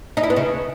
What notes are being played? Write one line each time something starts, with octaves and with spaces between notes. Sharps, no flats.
D#4
E4
B3
C#3